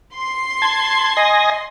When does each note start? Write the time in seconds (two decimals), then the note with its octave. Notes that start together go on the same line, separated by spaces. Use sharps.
0.16 C6
0.62 A5 G#6
1.17 D#5 G#5 A#6